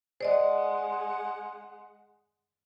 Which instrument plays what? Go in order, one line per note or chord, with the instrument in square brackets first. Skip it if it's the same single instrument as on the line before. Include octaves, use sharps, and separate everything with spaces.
[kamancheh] G#3 F#5 [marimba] C5 D5 D#5